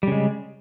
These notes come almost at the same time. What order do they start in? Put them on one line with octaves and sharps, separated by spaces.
G3 C#3 G#3